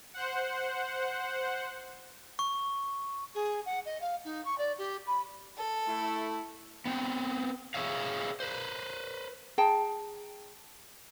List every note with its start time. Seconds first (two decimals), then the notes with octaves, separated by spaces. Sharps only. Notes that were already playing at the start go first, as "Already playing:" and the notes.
0.14 C5 F#5
2.39 C#6
3.34 G#4
3.65 F#5
3.85 D#5
4.01 F5
4.24 D#4
4.45 C#6
4.58 D5
4.78 G4
5.06 B5
5.57 A4
5.87 A3 E4
6.85 B3 C4
7.74 G#4 B4 C#5 E5 F5
8.40 B4 C5
9.58 G#4 G5 A5 A#5